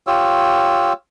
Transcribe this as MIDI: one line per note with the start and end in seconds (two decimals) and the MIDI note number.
0.07 0.93 65
0.07 0.93 67
0.07 0.93 73
0.07 0.93 88